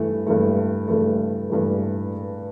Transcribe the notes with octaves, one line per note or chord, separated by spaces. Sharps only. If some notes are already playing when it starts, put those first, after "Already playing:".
Already playing: G2 E3 A3
G2 E3 A3
G2 E3 A3
G2 E3 A3